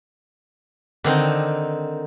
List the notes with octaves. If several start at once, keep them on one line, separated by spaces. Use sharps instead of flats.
D3 D#3 C4 D#4